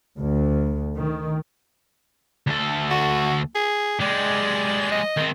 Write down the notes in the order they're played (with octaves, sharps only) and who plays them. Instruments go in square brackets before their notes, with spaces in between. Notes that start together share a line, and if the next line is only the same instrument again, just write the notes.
[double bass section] D2
D#3
[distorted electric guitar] D2 A4
[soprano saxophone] F#4
G#4
[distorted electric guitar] G#3 G4 [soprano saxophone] D5
[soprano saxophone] D#5
[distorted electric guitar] D#3 C4